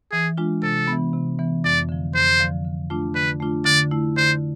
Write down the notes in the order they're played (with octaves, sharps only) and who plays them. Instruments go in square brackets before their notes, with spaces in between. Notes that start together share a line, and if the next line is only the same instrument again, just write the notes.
[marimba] E3 [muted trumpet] G#4
[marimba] G#3 D4 F4
[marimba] C3 [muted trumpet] A4
[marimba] B3
E3
C3
E3 B3
[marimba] F2 [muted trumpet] D5
[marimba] D3 F3
[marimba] F2 [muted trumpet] C5
[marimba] D3 F3
D3
A3 D4 F4
[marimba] D3 [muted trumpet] B4
[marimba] A3 D4 F4
[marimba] D3 [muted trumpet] D5
[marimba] A3 E4
[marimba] D3 [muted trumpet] C5